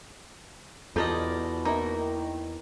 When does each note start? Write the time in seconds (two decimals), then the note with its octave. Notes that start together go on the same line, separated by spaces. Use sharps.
0.96 E2 B2 D#4 F4 G4 A4 D5 D#5
1.65 A#3 D#4 E4
1.97 D#3